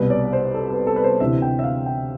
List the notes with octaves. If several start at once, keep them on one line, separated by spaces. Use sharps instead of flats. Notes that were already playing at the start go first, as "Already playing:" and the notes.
Already playing: C2 B2 B4
D5
C5
A4
B4
A4
B4
C5
D2 C3 E3 E5
G5
E5
F5
G5